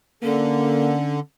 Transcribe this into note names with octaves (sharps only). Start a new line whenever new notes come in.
D3 A#3 C#4